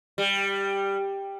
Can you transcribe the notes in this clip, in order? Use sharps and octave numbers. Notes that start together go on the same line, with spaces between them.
G3